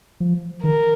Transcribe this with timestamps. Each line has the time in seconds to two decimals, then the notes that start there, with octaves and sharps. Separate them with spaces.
0.20 F3
0.64 D#3 A#4